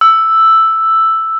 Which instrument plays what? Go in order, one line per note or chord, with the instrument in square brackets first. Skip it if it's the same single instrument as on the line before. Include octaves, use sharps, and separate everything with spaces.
[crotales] E6